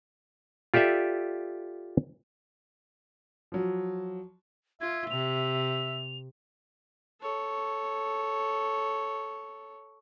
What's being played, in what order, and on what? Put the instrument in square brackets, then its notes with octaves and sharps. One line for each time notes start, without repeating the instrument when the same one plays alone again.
[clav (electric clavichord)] F4 G4 A4 D5 E5
[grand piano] F3 F#3
[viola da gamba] F4 [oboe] E5 [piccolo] G#6
[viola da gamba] C3 [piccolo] F7
[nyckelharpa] A4 C#5